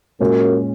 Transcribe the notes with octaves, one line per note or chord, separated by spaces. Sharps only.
F#2 A#2 G#3 C#4